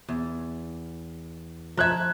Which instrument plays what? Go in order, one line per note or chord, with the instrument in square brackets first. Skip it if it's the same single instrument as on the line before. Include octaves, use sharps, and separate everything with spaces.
[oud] E2
[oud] F3 E5 [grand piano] A#5 F#6 G#6